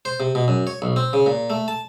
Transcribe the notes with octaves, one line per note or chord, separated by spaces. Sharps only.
C5
C3
B2
F#2
C#5
B1
C4
C#3
A#2
A3
A5